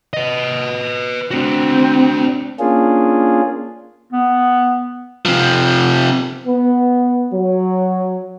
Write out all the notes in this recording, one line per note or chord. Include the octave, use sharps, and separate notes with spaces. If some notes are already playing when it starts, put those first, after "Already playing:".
B4 D#5
C4 D4 F#4
A#3 C#4 D4 F4 G#4
B3
C3 F3
B3
F#3